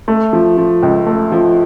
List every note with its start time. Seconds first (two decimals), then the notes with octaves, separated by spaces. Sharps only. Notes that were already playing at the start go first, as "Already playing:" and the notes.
0.08 A3
0.33 F3
0.58 F3
0.83 C#2
1.07 A3
1.32 F3